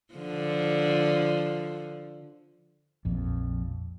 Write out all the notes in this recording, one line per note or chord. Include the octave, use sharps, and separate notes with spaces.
D3 F3
A#1 F2